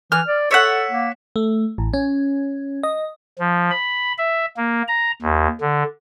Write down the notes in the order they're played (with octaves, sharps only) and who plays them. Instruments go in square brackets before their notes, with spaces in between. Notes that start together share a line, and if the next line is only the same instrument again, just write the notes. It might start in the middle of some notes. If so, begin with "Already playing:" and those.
[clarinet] E3 [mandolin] F6
[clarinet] D5
[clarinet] A4 [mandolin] C#5 E5 F#5
[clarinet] A#3
[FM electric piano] A3
A1
C#4
D#5
[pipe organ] F3
B5
E5
A#3
A#5
D#2
D3